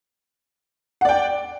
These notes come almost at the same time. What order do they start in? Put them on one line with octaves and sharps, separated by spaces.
F#5 D5 G5